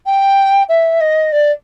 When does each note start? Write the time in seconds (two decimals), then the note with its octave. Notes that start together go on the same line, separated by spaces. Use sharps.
0.05 G5
0.68 E5
1.00 D#5
1.32 D5